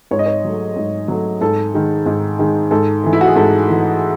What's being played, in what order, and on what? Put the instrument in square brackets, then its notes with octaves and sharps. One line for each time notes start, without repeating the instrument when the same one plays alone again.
[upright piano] G#2 C#5
D#5
C#5
F#3 A3
G#2
F#3 A3
G#2 A4
D#3 G#3
G#2
D#3 G#3
G#2 A4
E3 A3
E4
F#4
G#4
G#2 A4
E3 A3